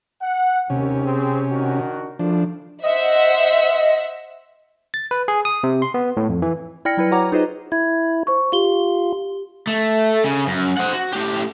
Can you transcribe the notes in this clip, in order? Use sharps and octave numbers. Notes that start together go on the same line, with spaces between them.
F#5
D#2 C3 C#4
C4 G#4
D#3 D4 F#4
C2 F#2 F3 A3 D4
C5 D#5 E5 F#5
A6
B4
G#4
D#6
C3
C6
B3
A2
F2
E3
E4 D5 G5 F6 A#6 C#7
F#3 E4 B4
F#4 C#5 F#5 A#5 D6
D#4 F4 G#4 B4 C5 D#5
E4 G#6
C5 C#6
F4 G4 G7
A3
C#3
F#2
C5 F#5
F#4
A2 G4